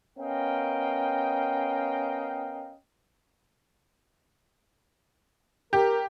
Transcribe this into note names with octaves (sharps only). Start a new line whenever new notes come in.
B3 C#4 A#4 D#5 F5 G5
G4 A#4